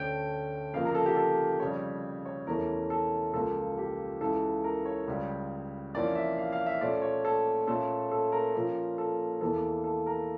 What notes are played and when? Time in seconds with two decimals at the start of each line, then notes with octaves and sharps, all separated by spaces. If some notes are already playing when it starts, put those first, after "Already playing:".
Already playing: D2 D3 A3 C#4 G5
0.73 F2 C#3 F3 A#3 F5
0.85 A#4
0.95 A4
1.06 G4
1.17 A4
1.60 F2 C#3 G3 C#5
2.26 C#5
2.47 E2 E3 A3 C#4 A#4
2.90 A4
3.33 C#2 C#3 F3 A#3 A4
3.78 G4
4.21 C#2 C#3 E3 A4
4.64 A#4
4.86 C#5
5.07 C#2 C#3 G3
5.95 F2 E3 A#3 C#4 D5
6.15 E5
6.38 F5
6.52 F5
6.66 E5
6.81 A#2 A3 C#4 D5
7.02 C#5
7.25 A4
7.68 A#2 A3 C#4 A4
8.11 A4
8.32 A#4
8.54 A#2 F3 C#4
8.98 A4
9.41 E2 E3 A#3 A4
9.84 A4
10.06 A#4